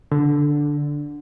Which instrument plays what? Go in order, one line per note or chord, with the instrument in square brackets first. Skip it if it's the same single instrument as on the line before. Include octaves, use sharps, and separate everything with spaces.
[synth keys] D3